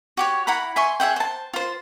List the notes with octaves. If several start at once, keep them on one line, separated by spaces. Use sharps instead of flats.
F#4 G4 C#5
E4 F#5 A#5 B5
E5 G#5 C6 C#6
G#4 E5 F#5 G5
C5 A5
F4 C5